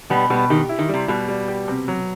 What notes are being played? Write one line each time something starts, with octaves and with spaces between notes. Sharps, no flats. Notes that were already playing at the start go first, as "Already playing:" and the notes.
B2 G3 B3
B2 G3 B3
D#3 G4
E4
D#3
C3 G3
B2 G3
G3
G4
C3
F#3